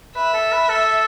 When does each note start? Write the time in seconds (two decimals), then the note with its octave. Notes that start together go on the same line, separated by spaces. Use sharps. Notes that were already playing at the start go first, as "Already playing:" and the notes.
0.16 B4 E5
0.34 A4
0.52 B4
0.69 A4